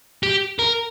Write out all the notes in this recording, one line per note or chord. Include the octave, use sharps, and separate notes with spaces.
G4
A#4